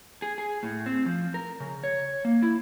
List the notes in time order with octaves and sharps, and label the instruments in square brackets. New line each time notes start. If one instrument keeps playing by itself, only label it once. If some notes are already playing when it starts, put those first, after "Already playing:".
[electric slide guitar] G#4
G#4
A2
C4
F3
A#4
C#3
C#5
A#3
E4